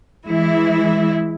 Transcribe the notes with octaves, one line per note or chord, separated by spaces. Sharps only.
E3 G#3 E4